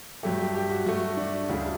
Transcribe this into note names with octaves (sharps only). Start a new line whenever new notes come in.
G2 F#3 A3 G4
G4
G4
F#4
G2 F#3 A3 F#4
D4
D2 C#3 G3 E4